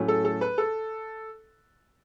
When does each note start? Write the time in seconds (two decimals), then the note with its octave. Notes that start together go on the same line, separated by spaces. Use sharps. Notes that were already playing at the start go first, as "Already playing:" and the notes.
Already playing: A2 F#3 A3 C#4
0.08 A4
0.25 A4
0.41 B4
0.58 A4